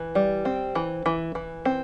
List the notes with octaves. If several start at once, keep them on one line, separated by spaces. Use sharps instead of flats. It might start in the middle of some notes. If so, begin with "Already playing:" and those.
Already playing: E3
G3
C4
E3
E3
E3
C4